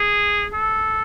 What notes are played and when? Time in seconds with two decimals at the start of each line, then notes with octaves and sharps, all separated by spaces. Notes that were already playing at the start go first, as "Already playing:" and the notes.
Already playing: G#4
0.53 A4